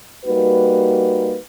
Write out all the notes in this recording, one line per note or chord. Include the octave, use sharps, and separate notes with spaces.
G3 A#3 D#4 F#4 B4